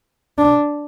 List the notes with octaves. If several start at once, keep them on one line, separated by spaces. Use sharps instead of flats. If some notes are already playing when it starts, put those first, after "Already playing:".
D4